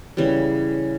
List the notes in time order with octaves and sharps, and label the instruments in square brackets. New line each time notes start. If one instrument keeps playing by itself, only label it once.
[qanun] C#3 E3 G3